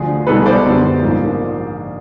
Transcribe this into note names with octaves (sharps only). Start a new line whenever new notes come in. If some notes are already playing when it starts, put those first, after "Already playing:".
Already playing: D2 D3 F3 G#4
C2 B2 G#3 B3 A4 B4
C5 D5
F#2 D3 G3 B3
A#1 G#2 F3 A#3